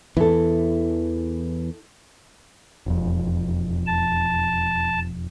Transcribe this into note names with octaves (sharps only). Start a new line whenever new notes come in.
E2 E3 E4 A4
E1 F2
A5